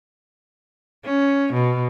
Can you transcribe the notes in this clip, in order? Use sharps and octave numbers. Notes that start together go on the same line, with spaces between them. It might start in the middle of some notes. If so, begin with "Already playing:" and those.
C#4
B2